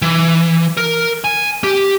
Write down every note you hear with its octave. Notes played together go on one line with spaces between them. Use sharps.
E3
A#4
G#5
G4